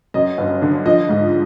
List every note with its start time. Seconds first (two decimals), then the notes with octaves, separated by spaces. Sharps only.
0.14 F#2 D#5
0.38 G1
0.62 D3
0.86 F3 D#5
1.09 G#2